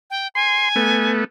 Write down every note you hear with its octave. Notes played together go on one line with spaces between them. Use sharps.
G5
G#5 C6
A3 B3